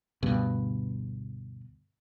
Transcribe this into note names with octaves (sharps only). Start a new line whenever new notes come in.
D2 G2 B2